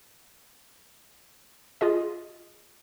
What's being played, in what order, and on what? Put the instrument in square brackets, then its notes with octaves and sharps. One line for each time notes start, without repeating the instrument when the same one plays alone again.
[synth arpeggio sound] F4 G#4 D#5